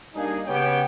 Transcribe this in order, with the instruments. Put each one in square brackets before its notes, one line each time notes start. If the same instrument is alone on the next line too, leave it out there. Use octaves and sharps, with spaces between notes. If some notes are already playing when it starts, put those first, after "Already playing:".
[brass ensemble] G3 A#3 D4 D#4 G#4
C#3 B3 C#4 G4 G5